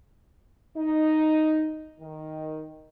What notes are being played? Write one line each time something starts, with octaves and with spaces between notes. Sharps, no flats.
D#4
D#3